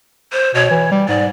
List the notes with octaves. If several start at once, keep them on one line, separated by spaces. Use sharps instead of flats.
C5
B2 C#5
E3
G3
G#2 D5